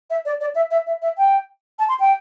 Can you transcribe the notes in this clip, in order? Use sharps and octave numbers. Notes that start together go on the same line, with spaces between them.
E5
D5
D5
E5
E5
E5
E5
G5
A5
C6
G5